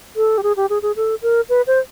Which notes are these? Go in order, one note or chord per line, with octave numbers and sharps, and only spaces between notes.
A4
G4
G#4
G4
G#4
G#4
A4
A#4
B4
C5